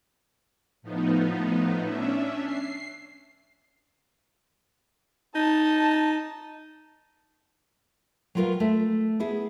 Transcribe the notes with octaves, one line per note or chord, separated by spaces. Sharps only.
A2 F3 B3 D#4
C#4 D4 E5
C7
D#4 A5
F#3 G3 F4 A#4 B4 F5
A3
B3 E4 G#4